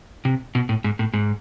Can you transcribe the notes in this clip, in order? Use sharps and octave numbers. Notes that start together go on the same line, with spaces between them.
C3
B2
A2
G#2
A2
G#2